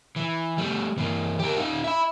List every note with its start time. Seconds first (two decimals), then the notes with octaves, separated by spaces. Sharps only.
0.16 E3
0.58 G3 A3
0.98 E3 A#3
1.39 G4 A#4
1.57 D#4 F4
1.84 E5 B5